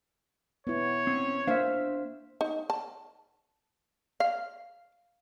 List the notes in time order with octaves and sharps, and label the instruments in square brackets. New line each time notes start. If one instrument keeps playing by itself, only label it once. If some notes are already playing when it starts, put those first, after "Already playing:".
[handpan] B3 E4 [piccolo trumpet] C#5
[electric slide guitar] C4 C#4
[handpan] A#3 C5 F5 [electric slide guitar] D4 E5
[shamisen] D#4
A5
F5